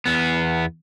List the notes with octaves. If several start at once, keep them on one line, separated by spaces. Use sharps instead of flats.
E2 B3